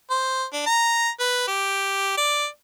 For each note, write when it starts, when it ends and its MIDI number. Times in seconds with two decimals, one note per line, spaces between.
0.10 0.45 72
0.53 0.62 62
0.66 1.10 82
1.20 1.45 71
1.48 2.17 67
2.18 2.46 74